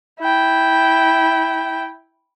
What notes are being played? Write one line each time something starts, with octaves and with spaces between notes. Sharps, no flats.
E4 G5